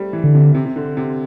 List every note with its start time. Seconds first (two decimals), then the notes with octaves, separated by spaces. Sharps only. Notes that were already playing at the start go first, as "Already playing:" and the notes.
Already playing: G3 A3 C4
0.13 E3
0.24 D3
0.35 C3
0.55 C3
0.65 C3
0.76 D3
0.97 C3